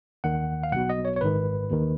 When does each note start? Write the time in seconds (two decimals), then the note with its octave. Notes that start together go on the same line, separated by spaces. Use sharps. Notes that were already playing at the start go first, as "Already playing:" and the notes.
0.24 D#2 D#3 F#5
0.63 F5
0.72 B1 B2 F#5
0.90 D#5
1.05 C#5
1.16 C#5
1.21 G#1 G#2 D#3 B4
1.70 D#2 D#3